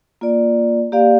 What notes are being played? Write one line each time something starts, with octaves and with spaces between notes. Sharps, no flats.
A#3 F4 D5
A#3 G4 D5 F5